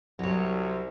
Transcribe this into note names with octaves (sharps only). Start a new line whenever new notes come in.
C2 F#3 C#5